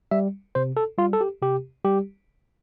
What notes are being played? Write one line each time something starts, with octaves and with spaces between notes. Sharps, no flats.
G3 E5
C3 C5
A4
G3 F4
A4
G4
C3 G4
G3 G4